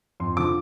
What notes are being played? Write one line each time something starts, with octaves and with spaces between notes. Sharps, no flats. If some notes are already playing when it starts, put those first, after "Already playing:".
F2 C6
D3 F3 D6